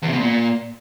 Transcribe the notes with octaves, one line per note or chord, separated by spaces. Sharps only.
E2
C3
B2
A#2